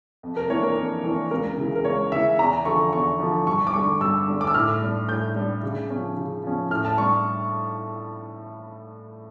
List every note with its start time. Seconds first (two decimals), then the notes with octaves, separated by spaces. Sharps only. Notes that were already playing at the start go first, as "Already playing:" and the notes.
0.23 F2
0.36 A#4
0.50 E3 A#3 D4 C#5
0.63 A#4
0.76 F2
1.04 E3 A#3 D4
1.31 C#2 A#4
1.58 C#3 E3
1.75 A#4
1.85 C#2 C#5
2.12 C#3 E3 E5
2.39 E2 A#5
2.65 D3 F3 C#6
2.92 E2 C#6
3.20 D3 F3
3.47 G2 C#6
3.67 D6
3.74 D3 G3 C#6
4.01 G2 E6
4.28 D3 G3
4.41 D6
4.47 E6
4.54 A2 F6
4.82 G3 D4
5.09 A2 G6
5.36 G3 D4
5.63 C#3
5.90 F3 C#4
6.17 C#3
6.43 F3 C#4
6.70 A2 F6
6.85 A5
6.98 G3 D4 C#6